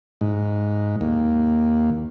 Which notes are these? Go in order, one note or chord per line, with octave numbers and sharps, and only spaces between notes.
G#2
D#2